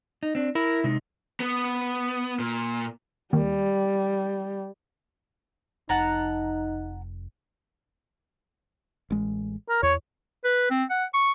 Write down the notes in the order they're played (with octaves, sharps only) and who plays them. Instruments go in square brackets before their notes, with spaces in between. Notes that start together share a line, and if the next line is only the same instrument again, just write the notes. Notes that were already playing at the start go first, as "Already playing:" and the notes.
[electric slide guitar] D#4
C4 D4
[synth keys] E4 [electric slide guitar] A#4
[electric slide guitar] C3 G#3 D#4
[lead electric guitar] B3
A#2
[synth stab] D#2 [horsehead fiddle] G3
[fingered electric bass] F1 [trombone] D#4 [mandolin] F#5 A5 A#5
[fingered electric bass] A1 G#3
[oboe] A#4
[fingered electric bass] E2 [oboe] C#5
[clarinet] B4
C4
F#5
C#6